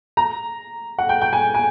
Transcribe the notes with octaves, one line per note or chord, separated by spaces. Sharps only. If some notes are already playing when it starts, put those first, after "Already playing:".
A#5
F#5
G5
G5
G#5
G#5